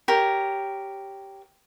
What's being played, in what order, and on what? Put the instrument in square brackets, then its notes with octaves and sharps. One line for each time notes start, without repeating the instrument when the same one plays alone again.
[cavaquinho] G4 A#4 C#5